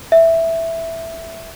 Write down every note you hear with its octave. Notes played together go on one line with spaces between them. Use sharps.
E5